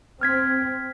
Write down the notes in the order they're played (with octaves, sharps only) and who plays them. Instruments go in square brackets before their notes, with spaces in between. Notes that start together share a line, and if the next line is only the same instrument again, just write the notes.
[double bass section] C4 [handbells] F6 G#6 B6